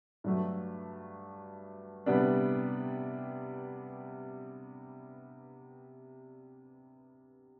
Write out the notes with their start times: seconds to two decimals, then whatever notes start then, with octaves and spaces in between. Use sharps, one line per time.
0.24 G2 F#3 A3
2.06 C3 G3 B3 D4